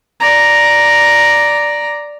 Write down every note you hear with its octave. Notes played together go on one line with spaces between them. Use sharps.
D5 A#5